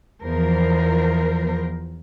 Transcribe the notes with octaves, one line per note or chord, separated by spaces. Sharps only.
E2 F3 A#4 C5